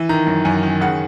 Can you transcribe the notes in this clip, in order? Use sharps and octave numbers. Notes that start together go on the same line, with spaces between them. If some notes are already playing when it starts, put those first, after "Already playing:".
Already playing: E3
D#3 A#5
F#2
F#2 G#5
D#3
C#3 F#5